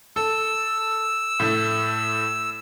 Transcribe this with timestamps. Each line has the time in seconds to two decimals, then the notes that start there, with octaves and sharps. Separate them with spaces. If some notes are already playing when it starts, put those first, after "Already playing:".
0.16 A4 E6
1.40 A2 A3